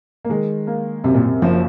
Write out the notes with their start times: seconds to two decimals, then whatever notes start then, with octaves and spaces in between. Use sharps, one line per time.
0.25 A#3
0.29 D#3 G#3
0.67 A#3
1.04 F#2 C3
1.15 A#2
1.23 C3
1.42 F#1 F3